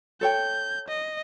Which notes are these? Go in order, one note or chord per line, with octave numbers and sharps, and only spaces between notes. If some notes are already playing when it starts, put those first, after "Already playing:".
A4 C#5 G5 G6
D#5